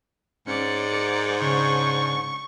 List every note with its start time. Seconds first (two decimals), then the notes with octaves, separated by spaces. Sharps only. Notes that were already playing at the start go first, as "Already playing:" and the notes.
0.47 G#2 C#4 D5 C#7
0.93 A#4
1.42 C#3 C#4 D4 C#6